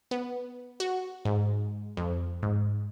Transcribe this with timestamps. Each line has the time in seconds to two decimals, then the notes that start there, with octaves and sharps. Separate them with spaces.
0.11 B3
0.80 F#4
1.25 G#2
1.97 F2
2.43 G#2